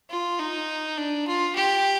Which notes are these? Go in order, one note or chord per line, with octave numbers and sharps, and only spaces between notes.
F4
D#4
D4
F4
G4